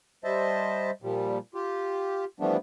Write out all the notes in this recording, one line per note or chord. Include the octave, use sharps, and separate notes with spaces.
G3 C5 D#5 E5 A5
A#2 F3 G3
F4 G4
E3 F3 G3 A3 B3 D4